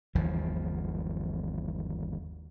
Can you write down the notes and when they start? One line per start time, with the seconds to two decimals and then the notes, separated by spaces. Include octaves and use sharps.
0.15 G1 D#2 E3 F3